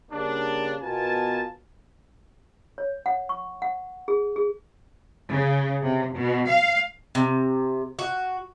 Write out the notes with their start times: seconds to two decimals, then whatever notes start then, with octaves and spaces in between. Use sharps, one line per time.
0.11 C#3 G3 A#3 D4
0.82 B2 B3 F4 A#4 G#5 A5
2.78 C#5
3.06 F#5
3.29 C#6
3.62 F#5
4.08 G#4
4.36 G#4
5.29 C#3
5.82 C3
6.14 B2
6.48 F5
7.15 C3
7.99 F#4